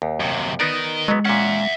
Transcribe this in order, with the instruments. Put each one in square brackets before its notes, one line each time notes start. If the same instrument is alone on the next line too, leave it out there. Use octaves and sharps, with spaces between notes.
[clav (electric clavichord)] D#2
[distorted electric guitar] F#2 C3
[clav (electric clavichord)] B3 D#4 D5 [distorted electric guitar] A#4 D#5
[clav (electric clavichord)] F#3 B3 [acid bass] G#3
[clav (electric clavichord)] A#2 C#4 [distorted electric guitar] E5 F#5